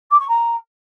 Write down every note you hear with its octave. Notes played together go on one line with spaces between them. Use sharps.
D6
C#6
A#5